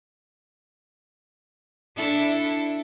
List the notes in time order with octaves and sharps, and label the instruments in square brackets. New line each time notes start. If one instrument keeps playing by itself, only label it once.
[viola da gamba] D4 E4 A4